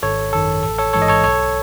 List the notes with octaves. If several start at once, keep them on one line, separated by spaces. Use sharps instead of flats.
G#1 A4 C#5
F#2 D#3 A4
A1 A4
A4 C#5
G#2 E3 G#3 A4 C#5
D#5
A4 C#5
B1 A4 C#5